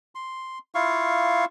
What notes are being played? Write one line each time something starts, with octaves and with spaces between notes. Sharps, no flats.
C6
E4 F4 F5 C#6